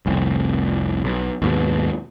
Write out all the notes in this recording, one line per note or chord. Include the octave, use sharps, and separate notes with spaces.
F1 C2
B1
D#2 G#2 B2